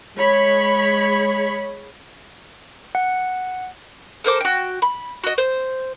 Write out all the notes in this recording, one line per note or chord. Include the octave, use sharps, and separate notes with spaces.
G#3 C#5 B5
F#5
A4 A#4 C5 D6
F#4 G5
B5
F#4 D#5
C5